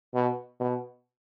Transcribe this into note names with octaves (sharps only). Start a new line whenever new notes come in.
B2
B2